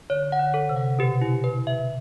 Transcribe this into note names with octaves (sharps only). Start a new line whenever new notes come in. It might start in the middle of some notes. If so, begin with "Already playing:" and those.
D3 C#5
F#5
D3
A4
C3
F#5
B2 G4
E4
B4
E5